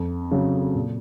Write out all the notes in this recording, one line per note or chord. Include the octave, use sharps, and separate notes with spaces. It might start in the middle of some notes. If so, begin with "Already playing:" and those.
Already playing: F2
C#3 F#3
A#2